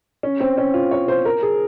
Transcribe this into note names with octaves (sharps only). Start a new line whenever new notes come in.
C#4
C4
C#4
F4
C#5
C5
A#4
G#4